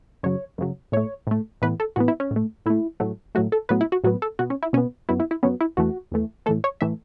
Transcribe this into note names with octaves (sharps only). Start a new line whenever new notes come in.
F#2 C#3 F#3 C#5
F#2 C#3 F#3
A2 A3 C#5
A2 A3
A2 E3 B3 B4
A4
A2 E3 B3 F#4
E4
C#4
A2
A3
A2 A3 E4
A2 F#3 A3
A2 F#3 A3 F#4
A4
A2 F#3 B3 B4
E4
F#4
A2 F#3 B3 F#4
A4
B2 B3 F#4
C#4
E4
B2 B3 C#4
F#2 F#3 B3 E4
E4
E4
F#2 F#3 B3 C#4
E4
E2 E3 A3 F#4
E2 E3 A3
A2 E3 A3 A4
C#5
A2 E3 A3 E5